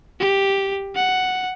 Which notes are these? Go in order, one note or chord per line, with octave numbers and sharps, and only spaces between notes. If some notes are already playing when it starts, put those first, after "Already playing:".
G4
F#5